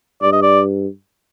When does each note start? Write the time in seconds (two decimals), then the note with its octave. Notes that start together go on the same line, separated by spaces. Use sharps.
0.22 G2 D5
0.33 D#5
0.42 D5